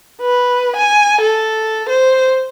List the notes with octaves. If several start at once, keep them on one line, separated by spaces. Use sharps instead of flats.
B4
G#5
A4
C5